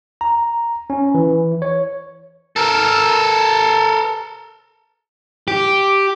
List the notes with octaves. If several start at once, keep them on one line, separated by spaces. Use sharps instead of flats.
A#5
C#4
E3
C#5
A4 A#4
G4